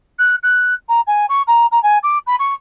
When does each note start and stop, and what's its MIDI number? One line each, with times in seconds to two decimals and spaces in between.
0.19 0.36 90
0.43 0.74 90
0.89 1.01 82
1.07 1.26 80
1.29 1.42 85
1.47 1.66 82
1.72 1.81 82
1.83 1.98 80
2.03 2.18 86
2.27 2.36 83
2.39 2.54 85